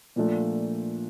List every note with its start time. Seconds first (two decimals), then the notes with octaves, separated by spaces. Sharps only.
0.16 A#2 F3 A3 D4